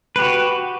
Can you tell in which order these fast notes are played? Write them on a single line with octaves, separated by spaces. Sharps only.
B4 G4 F#4